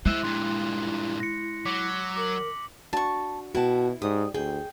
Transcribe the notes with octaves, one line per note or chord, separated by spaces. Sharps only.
G#3 E4 C5 E5 F#6
G2 A#2 C6
A#6 C#7
F#3 D6 B6
A#4 D6 F#7
D4 F#4 A5 C#6
B2 E4 F#4 G5 A5
G#2 G4 D5 D#6
D2 G#4 G5